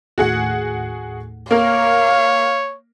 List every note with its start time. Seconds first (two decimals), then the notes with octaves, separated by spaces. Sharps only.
0.18 D#2 A2 F#4 G#4 F#5
1.51 A#3 A#4 C#5 F5